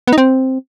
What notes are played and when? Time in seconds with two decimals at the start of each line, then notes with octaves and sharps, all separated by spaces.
0.07 B3
0.13 D#4
0.18 C4